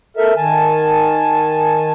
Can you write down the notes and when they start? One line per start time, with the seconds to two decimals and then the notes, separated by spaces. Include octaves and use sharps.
0.17 A4 A#4 E5
0.36 D#3 G#5 A5